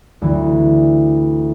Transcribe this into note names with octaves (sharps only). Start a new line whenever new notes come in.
D2 E3